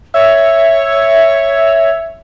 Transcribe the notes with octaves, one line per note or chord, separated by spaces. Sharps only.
C#5 E5